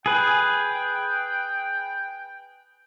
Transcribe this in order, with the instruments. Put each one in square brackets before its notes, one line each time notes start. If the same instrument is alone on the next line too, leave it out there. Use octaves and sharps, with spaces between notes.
[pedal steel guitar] G#4 B4 [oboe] G5